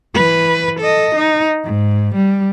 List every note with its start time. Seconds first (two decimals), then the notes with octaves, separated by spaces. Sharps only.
0.15 E3 B4
0.79 A4 D#5
1.16 D#4
1.64 G#2
2.15 G3